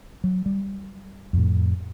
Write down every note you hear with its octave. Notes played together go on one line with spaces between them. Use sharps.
F#3
G3
F2 A2